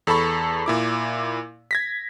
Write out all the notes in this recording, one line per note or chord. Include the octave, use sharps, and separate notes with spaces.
E2 A4 A5 B5 C#6
A#2 E4 D6
G#6 A#6 B6